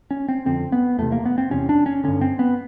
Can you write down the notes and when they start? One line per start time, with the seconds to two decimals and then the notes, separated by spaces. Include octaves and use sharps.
0.11 C#4
0.28 C4
0.46 F2 D3 C4
0.72 B3
0.98 E2 C3 A3
1.12 A#3
1.25 B3
1.38 C4
1.51 E2 C3 C#4
1.69 D4
1.86 C#4
2.03 G2 D3 C#4
2.21 C4
2.39 B3